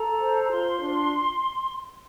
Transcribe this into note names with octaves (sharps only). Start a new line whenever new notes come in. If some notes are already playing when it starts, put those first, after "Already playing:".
Already playing: A4 A#5
C5
F4 C6
D4